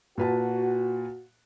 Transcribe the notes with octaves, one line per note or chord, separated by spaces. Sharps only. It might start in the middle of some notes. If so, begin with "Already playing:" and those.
A#2 F#4 B4 A5